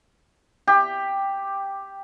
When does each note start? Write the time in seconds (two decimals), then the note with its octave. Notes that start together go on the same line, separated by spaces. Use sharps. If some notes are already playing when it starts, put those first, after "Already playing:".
0.67 G4